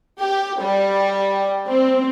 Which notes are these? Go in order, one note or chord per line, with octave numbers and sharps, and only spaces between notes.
G4
G3
C4